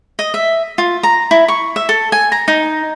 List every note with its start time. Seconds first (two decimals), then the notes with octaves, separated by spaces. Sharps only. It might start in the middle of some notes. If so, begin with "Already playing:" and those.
0.19 D#5
0.34 E5
0.78 F4
1.03 A#5
1.31 E4
1.48 C#6
1.76 E5
1.89 A4
2.12 G#5
2.32 A#5
2.48 D#4